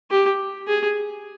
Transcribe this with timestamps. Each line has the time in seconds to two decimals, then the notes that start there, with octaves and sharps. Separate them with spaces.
0.11 G4
0.68 G#4